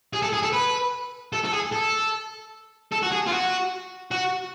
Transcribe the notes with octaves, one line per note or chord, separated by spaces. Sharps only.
G#4
A4
G#4
A4
B4
A4
A4
G#4
A4
A4
F#4
G#4
F4
F#4
F#4